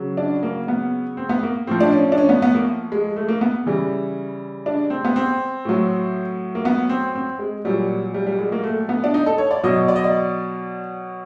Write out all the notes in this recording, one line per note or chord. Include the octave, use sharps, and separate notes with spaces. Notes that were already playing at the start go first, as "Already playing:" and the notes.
Already playing: C#3 F#3
D4
A#3
B3
C4
B3
A#3
A2 F3 C4
D4
C#4
D4
C#4
B3
B3
A#3
G#3
A3
A#3
B3
C#3 E3 G3
D4
C4
B3
C4
A2 F#3
A#3
B3
C4
C4
G#3
A#2 F#3 G3
G3
G3
G#3
A#3
A3
B3
D4
D#4
A4
C#5
D5
B2 F#3 D#5
D5
D#5
D5